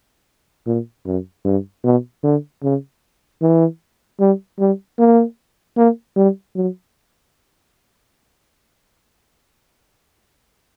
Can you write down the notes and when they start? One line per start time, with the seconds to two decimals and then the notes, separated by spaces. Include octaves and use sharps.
0.66 A#2
1.06 F#2
1.45 G2
1.84 B2
2.23 D3
2.63 C#3
3.42 E3
4.20 G3
4.59 G3
4.99 A#3
5.77 A#3
6.16 G3
6.56 F#3